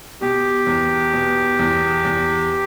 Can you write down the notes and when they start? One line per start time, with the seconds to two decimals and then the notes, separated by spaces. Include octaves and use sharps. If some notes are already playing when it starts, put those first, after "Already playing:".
0.21 B2 G4
0.67 E2
1.13 B2
1.59 E2
2.04 E2